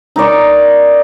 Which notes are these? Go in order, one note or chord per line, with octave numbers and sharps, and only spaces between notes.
D#4 A#4 D5 C#6